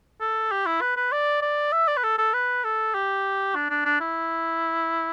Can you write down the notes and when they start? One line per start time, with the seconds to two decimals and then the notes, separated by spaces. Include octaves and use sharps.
0.20 A4
0.51 G4
0.66 E4
0.81 B4
0.97 B4
1.12 D5
1.42 D5
1.73 E5
1.88 D5
1.97 B4
2.03 A4
2.18 A4
2.34 B4
2.64 A4
2.95 G4
3.55 D4
3.70 D4
3.85 D4
4.00 E4